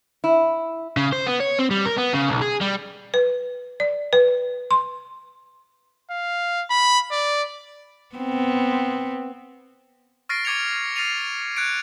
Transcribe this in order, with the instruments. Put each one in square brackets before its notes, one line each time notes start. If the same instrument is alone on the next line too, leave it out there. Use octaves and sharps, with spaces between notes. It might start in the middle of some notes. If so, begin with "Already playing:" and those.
[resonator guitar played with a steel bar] E4
[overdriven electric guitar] C#3
C5
B3
C#5
C4
G3
A#4
B3
C#3
B1
G#4
G3
[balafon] B4
D5
B4
C6
[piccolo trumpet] F5
B5
D5
[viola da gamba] B3 C4
[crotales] C#6 F6 A6 A#6 C7 D7
C#6 D6 G#6 C#7 F7
F6 A6 A#6 C7 D#7 F7
F#6 G#6 C#7 D7